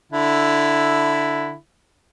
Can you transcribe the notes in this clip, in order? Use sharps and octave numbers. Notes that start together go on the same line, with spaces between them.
D3 E4